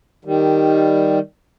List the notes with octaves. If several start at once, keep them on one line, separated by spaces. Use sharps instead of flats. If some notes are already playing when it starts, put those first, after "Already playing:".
D#3 G3